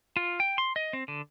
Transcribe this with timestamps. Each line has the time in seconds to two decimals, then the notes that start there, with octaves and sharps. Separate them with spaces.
0.17 F4
0.40 G5
0.58 C6
0.76 D#5
0.93 C4
1.08 D3